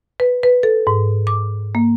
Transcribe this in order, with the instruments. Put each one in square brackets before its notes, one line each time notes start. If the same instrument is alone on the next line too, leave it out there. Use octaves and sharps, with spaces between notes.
[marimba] B4
B4
A4
G#2
D6
A#3